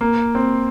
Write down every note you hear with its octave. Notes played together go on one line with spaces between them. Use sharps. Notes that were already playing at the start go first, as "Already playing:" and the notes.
A#3
C4